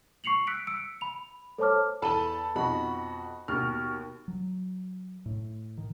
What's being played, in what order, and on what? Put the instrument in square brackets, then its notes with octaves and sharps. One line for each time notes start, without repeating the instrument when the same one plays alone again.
[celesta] C#6 C7 C#7 F7 F#7
E6 F#6 B6 C#7 D7
E6 C#7 D7
B5 F7
A4 C5 C#5 A5 D6 F6
[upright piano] E2 D#7 G7 [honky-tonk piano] A4 A5 B5
[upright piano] F2 B2 [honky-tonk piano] D#4 F#4 B5
[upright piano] D#2 B2 [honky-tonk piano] F6
[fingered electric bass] F#3
A2
D#3